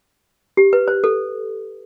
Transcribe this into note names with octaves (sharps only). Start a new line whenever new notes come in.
G4
B4
C5
A4